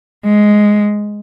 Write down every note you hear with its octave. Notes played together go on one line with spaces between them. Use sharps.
G#3